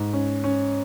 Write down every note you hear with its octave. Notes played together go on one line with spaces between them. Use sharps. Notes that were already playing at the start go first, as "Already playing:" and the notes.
Already playing: G#2
C#4
C#4